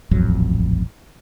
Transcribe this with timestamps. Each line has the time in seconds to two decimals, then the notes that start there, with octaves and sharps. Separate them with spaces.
0.11 D#1 A1 F2 F#3